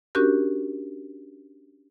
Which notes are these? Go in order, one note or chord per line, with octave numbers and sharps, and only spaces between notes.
C#4 D4 F#4 G4 A#4